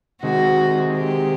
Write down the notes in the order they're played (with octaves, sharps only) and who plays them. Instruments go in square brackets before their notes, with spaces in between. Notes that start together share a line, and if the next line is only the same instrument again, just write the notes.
[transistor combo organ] C3 D#3 G#3 [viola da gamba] F#4
[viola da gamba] G4